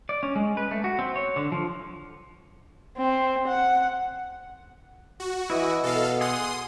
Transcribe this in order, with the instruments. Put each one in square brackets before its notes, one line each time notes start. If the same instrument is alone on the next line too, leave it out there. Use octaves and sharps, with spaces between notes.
[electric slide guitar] D5
C#4
G#3
B4
A3
F#4
C4
C#5
D3
F3
[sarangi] C4
F#5
[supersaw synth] F#4
[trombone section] E3 [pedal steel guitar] E4 D#5
[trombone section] B2 [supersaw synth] A4 F5
[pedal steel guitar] G#4 F#5 [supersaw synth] C6 D#6